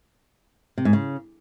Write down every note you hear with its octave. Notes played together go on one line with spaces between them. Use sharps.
C3
G#2
C#3